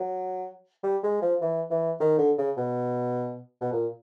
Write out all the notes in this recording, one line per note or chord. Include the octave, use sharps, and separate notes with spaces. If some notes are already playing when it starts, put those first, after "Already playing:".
Already playing: F#3
G3
G#3
F3
E3
E3
D#3
D3
C#3
B2
B2
A#2